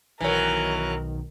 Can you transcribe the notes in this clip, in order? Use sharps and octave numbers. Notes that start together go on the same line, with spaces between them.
B1 D#3 E3 F#3 A#4